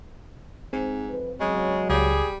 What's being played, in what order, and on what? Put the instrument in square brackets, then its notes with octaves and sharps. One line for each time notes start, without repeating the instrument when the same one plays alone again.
[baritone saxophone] G#2 [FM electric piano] C4
[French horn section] F2 B4
[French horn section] E2 F#3 [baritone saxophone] C#3 [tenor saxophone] G#3
[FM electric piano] C#2 D6 [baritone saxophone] G3 [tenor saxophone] G#4